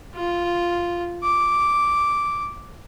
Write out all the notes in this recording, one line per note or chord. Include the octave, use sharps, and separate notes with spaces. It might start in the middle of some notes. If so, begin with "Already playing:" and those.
F4
D6